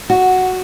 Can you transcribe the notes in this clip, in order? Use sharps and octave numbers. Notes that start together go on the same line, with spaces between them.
F#4